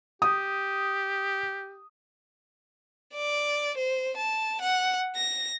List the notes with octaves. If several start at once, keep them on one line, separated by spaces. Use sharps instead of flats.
G4 D#6
D5
C5
A5
F#5
A#6